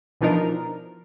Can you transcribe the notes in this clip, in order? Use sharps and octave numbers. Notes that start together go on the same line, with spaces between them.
B2 E3 F3 D4 D#4 A#4